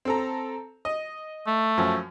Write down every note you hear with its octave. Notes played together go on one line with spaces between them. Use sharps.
C4 A4 A#5
D#5
A3
F#2 F3